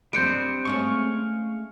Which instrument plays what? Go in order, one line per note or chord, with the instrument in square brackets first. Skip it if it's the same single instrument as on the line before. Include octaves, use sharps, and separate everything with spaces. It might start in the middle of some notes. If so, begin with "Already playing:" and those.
[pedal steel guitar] G3 D4 C5 [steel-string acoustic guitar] C4 D#5 [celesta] G6 C#7 D7
[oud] G#3 A3 C#4 [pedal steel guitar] F5 C#6